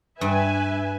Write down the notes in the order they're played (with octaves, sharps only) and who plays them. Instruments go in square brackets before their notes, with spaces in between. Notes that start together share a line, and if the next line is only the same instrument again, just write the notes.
[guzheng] G2 [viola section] B4 E5 G#5